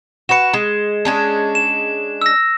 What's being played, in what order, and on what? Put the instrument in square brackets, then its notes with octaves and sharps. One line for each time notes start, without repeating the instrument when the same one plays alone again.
[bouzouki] F#4 B4 [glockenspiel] C#7 E7
[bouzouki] G#3
G#3 C#4 D4
[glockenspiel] E7
E6 A#6